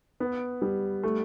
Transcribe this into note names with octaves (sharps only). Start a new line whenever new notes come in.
B3
G3
A3